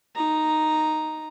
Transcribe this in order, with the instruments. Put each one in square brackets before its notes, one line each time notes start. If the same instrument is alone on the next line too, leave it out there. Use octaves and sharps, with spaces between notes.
[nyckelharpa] D#4 A#5